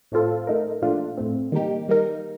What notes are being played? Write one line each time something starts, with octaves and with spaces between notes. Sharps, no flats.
A2 A3 C4 F4 A4
A3 D#4 A#4
A#2 F3 A3 D4 F4
A2 A3 C4
D#3 G3 A#3 D#4 G4
G3 A#3 D#4 A#4